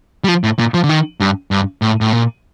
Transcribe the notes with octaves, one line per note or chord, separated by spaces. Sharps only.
G3
F3
A2
A#2
F3
D3
D#3
G2
G2
A2
A2
A#2